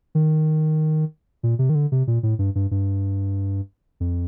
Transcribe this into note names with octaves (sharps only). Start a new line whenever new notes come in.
D#3
A#2
C3
D#3
D3
C3
A#2
A2
G2
G2
G2
F2